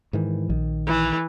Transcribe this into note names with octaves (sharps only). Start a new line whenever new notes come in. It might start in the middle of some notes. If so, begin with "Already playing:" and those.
G#2 D#3 E3
A#1 D#3
E3